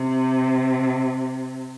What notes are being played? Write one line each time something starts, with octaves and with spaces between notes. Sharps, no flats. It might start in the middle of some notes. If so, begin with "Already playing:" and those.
Already playing: C3